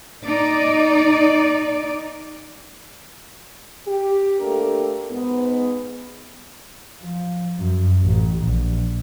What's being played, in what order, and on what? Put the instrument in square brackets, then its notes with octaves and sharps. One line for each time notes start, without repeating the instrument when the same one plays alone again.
[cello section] D#4 D5
[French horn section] G4
A3 A#3 D4 G4 A4 A#4
G#2 B3
[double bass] F3
F#2
A1
A#1